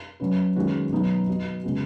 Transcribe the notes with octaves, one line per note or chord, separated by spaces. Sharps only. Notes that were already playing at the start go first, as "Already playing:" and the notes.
F#3 C#4 B4
D#3 G#3 C#4 F#4 B4
B2 F#3 B3 D#4
B3 F#4 D#5
C#3 G#3 B3 F#4